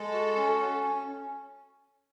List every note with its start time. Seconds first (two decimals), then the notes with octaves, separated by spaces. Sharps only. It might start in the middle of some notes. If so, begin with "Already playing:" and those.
Already playing: G#3 A4
0.13 F#4
0.37 C#4
0.60 C#4
0.84 C#4